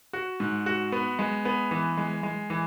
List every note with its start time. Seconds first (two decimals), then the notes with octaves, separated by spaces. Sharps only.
0.13 F#4
0.40 G#2
0.66 F#4
0.92 B3
1.19 G#3
1.45 B3
1.71 E3
1.97 G#3
2.23 G#3
2.50 E3